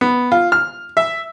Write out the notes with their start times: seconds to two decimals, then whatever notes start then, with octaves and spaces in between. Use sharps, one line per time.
0.01 B3
0.32 F4
0.52 F6
0.97 E5